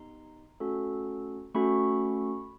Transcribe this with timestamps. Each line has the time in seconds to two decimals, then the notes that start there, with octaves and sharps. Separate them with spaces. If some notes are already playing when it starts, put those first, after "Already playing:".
Already playing: B3 D#4 G4 A#5 C6
0.60 A3 C#4 F#4 A4
1.54 A3 C#4 F#4 A4 B5 C#6